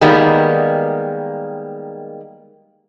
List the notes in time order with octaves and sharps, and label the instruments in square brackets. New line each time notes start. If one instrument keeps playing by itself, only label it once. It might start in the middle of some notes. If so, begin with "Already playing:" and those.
[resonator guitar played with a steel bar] D#3 G3 G#3 A#3 B3